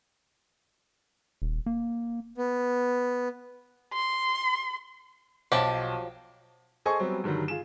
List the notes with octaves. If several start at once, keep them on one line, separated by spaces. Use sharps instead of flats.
D#1
A#3
B3
C6
B1 F3 F#3 G4 A5
G#4 A4 C5 D#5 G#5 C#6
F#3 G3 B3 C4
G2 D3 D#3 F#3 G3
F4 G#4 E7